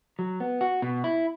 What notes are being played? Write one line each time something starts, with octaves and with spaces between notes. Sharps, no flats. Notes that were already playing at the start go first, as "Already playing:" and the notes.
F#3
B3
F#4
B2
E4